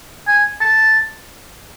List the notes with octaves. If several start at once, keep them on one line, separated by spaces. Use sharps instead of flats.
G#5
A5